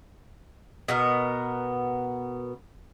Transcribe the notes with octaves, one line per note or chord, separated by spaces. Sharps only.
B2 B3 A#4